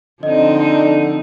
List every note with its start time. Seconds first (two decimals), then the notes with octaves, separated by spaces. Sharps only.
0.23 D3 F3 C4 D#4 D#5